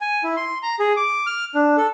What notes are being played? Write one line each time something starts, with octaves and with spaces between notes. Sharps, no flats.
G#5
E4
C6
A#5
G#4
D6
F6
D4
A4